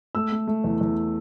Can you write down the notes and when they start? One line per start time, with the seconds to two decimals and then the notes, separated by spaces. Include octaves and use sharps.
0.15 A3 E6
0.32 A3
0.47 A3
0.64 E2
0.81 E2